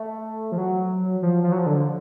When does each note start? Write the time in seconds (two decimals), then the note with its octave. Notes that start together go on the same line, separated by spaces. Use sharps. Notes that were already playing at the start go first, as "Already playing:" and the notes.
Already playing: A3
0.52 F3
0.58 F#3
1.22 F3
1.43 F3
1.52 F#3
1.59 F3
1.66 D3